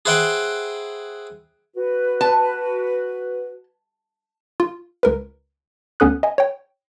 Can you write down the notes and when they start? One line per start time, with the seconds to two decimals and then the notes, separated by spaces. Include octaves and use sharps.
0.05 G#4 B4 C5 E5 F#5 G5
1.76 F#4 B4
2.21 A5
4.60 F4
5.03 C#2 A#4 B4
6.00 D2 B3 C#4 A4 D#6 F#6
6.23 D#5 G#5
6.38 C#5 G5